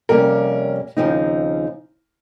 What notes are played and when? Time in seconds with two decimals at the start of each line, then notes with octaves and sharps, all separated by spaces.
0.09 F2 C3 G3 A#3 C#4 A#4
0.97 D#2 C#3 F3 C4 D#4